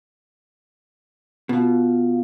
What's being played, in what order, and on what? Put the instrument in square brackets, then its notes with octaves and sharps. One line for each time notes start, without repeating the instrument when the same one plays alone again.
[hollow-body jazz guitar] B2 [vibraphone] F4 F5